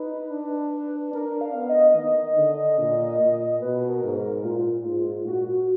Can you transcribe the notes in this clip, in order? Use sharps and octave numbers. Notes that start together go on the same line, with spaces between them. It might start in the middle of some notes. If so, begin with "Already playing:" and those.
Already playing: D#4 B4
D4
D4 A#4
F5
B3
D#5
D#3
D3
A#2
A#2
B2 B4
A#4
G#2
A#4
A#2 F4
G#2
A#2 F#4